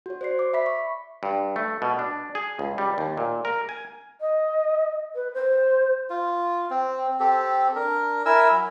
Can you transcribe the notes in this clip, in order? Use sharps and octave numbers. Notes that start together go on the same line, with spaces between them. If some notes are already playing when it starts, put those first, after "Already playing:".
F#4 C#5
C5 D5 C7
D6
E5 B5 B6
C#6
G2
A3
B2
D4
G#4
C#2
G3
D#2
A#2
A#4
G#5
D#5
B4
C5
F4
C4
C4 G4 A4
D4 A#4
E4 A#4 G#5 E6
F#3